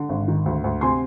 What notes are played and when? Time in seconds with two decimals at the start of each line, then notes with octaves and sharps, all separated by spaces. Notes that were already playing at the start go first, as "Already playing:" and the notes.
Already playing: D3
0.09 G#1
0.28 D#3
0.46 D2
0.64 D2
0.81 C3 G#5 C6